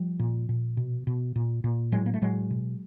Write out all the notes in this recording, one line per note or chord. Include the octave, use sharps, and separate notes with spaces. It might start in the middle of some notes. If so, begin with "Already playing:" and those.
Already playing: F3 G3
A#2
A#2
B2
B2
A#2
A#2
A2 F#3 G#3
A#3
A3
A2 F#3 G#3
B2